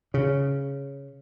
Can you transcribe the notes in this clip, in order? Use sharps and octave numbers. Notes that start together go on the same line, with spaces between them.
C#3